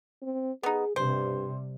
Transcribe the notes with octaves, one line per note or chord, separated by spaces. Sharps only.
C4
B3 D#4 G#4
G2 C3 G3 C5